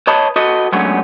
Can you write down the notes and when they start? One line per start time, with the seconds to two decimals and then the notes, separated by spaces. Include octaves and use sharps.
0.07 B4 C#5 D#5 A5 B5
0.36 F#4 A4 B4 D#5
0.72 F#3 G#3 A3 B3 C#4 D4